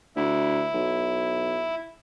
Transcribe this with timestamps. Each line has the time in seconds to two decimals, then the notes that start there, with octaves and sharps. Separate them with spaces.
0.16 D2 E4
0.74 B1